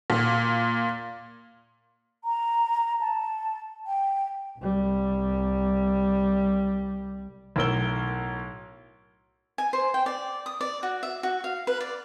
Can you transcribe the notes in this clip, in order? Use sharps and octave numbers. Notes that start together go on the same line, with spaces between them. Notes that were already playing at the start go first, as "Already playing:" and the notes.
A#2
A#5
A5
G5
C2 G3
B1 A2 A#4 E6 G7
G#5
C5
G5
D5
D#6
D5
F#4
E5
F#4
F5
B4
D5